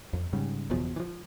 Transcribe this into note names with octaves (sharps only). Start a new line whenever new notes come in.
F2
G#2 C#3 G3
F#1 E2 B2 F3
E3 F3